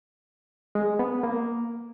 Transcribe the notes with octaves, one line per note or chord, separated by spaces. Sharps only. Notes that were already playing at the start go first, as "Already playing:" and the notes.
G#3
B3
A#3